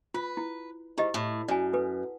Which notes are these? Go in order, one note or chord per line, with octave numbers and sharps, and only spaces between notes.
F4 B4
E4
G#2 E4 G4 D#5
A2
F#2 D5 G#5
A4 B4